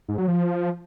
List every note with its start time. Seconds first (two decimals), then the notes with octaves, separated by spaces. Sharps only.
0.09 G#2
0.18 F#3
0.28 F3